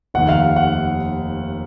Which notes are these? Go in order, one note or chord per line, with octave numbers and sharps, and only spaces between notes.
F1 D#2 D#3 F#5
F5
F5
F#5